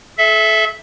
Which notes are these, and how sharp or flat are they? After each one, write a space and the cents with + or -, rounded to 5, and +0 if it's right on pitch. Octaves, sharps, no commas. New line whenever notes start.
A4 -35 E5 +0